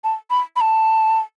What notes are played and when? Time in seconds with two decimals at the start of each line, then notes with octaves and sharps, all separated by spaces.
0.04 A5
0.30 B5
0.56 B5
0.61 A5